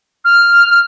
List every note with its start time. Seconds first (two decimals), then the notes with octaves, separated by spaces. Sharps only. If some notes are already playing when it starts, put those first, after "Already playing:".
0.25 F6